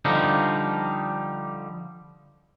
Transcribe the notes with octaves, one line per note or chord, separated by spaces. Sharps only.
D3 F3 G3 D#4